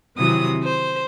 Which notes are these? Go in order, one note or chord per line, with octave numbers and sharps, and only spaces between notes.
C3 D#3 E3 F#3 D#6
C5